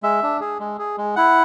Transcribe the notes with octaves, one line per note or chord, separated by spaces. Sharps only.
G#3 E5
D4
G#4
G#3
G#4
G#3
E4 F#5